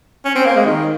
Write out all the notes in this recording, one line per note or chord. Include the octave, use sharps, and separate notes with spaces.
C#4
C4
A#3
G#3
D#3